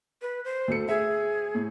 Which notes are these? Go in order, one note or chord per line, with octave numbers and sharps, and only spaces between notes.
B4
C5
D2 A4 C#7
G#4 E5
A2